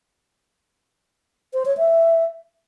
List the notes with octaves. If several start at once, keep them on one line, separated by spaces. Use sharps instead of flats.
C5
C#5
E5